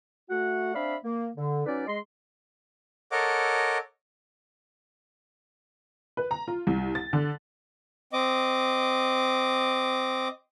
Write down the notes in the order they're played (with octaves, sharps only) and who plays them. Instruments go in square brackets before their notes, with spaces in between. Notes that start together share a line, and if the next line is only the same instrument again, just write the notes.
[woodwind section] A3 F#4 F#5
C4 D4 D5 E5 F5 B5
A#3
D3
F#3 C#4 D#4 B4 D5
G#3 D#5 C6
[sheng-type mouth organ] A4 A#4 C#5 D#5 F#5 D6
[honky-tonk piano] B4
A#5
F4
C2
A6
D3
[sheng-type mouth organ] C4 D#5 D6